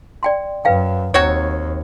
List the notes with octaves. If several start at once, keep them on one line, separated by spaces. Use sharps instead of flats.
D5 G5 C6
F#2 B4 F5 G5
D#2 C4 F#4 C#5